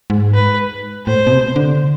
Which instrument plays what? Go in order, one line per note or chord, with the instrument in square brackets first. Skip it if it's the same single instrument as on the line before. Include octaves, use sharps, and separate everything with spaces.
[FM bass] G#2
[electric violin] B4
[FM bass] A2 [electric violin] C5
[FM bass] B2
C3
D3